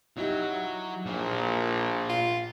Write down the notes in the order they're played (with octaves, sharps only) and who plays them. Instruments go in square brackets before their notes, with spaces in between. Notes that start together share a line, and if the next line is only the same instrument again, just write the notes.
[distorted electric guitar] F#3 [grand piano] D#4 E4 G4
[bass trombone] A#1 [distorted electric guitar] A#2
[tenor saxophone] F4